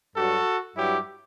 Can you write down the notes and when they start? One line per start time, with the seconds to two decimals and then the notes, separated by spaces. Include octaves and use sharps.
0.16 G2 F#3 F#4 A4
0.76 G2 F#3 E4 G4